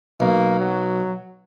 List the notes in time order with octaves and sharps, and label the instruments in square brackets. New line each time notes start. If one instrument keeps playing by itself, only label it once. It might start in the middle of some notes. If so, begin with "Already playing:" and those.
[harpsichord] B1 [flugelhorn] A#3
[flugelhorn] F#3